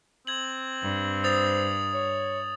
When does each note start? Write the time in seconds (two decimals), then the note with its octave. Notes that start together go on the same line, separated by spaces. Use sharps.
0.27 C4 G#6 F#7
0.81 G2
1.24 C5 D#6 A6 F7
1.93 C#5